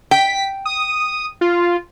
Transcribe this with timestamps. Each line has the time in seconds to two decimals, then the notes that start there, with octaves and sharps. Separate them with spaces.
0.11 G5 B6
0.65 D#6
1.41 F4